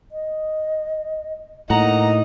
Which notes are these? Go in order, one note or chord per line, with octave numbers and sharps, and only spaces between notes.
D#5
A2 A#3 D#4 F#5 A#5